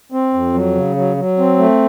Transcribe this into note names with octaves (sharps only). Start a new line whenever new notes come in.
C4
F2
F#3
C#3
F#3
F#3
C4
A3